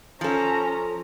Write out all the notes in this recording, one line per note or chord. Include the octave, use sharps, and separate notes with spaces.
F3 C#4 A4 A#5